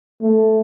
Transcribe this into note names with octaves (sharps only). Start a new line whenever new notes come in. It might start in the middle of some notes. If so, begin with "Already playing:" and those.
A3